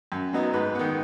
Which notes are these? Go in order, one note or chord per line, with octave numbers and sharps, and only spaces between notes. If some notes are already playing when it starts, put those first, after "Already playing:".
F#2
F#3 B3 D#4
G#2 B4
D#3 B3